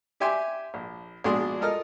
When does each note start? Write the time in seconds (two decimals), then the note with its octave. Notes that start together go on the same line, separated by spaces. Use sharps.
0.20 G4 E5 G5 G#5 C6 D6
0.74 A#1
1.24 A#1 B2 G#3 D4 G#4 C6
1.61 F4 A4 A#4 D#5 F6